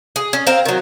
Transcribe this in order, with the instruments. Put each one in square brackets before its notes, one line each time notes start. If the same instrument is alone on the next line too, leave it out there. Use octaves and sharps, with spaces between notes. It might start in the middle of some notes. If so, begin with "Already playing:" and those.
[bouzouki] G#4
C#4
C4 A#4 F5
D#3 F#3